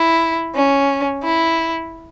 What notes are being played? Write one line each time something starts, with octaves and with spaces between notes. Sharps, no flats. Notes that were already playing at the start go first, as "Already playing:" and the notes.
Already playing: E4
C#4
E4